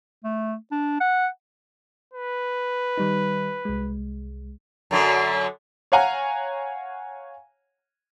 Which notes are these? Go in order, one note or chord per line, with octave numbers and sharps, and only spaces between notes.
A3
D4
F#5
B4
D#3 G3 D#4
C2 G#3
F#2 D3 F#3
C#5 F5 F#5 G#5 A#5